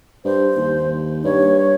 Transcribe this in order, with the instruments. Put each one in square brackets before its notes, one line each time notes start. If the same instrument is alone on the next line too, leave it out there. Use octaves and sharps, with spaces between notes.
[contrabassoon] G2 [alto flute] C5
[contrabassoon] D#2
[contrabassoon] G2 [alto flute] C#5